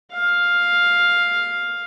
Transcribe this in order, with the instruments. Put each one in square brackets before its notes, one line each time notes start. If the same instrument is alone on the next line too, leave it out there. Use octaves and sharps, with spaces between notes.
[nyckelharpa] F5